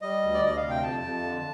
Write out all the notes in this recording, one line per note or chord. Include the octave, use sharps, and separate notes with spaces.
G3 D#5
D2
D5
D2 D#5
F5
C3
G5
F2 A5
F2
D3